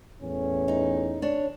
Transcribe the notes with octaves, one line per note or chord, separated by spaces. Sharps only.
E2 A2 C#4
D#4
D4 C#5